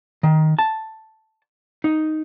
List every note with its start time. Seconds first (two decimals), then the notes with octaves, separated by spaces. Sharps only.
0.23 D#3
0.59 A5
1.84 D#4